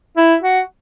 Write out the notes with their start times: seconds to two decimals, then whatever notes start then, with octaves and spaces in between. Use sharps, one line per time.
0.17 E4
0.42 F#4